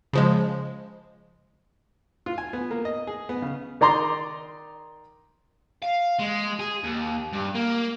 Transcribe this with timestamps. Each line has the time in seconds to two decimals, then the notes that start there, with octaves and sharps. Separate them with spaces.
0.13 C#3 F3 G#3
2.26 F4
2.38 G#5
2.53 B3
2.71 A#3
2.85 D#5
3.07 G#4
3.29 B3
3.42 C#3
3.81 D#3 D5 A#5 C6 D6
5.82 F5
6.19 G#3
6.60 G#4
6.83 D#2
7.32 G2
7.55 A#3